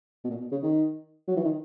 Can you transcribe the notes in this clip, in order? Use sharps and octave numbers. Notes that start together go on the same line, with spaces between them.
B2
A#2
B2
C#3
D#3
F#3
E3
D#3